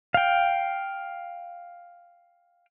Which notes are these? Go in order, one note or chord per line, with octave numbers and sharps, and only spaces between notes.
F5 G5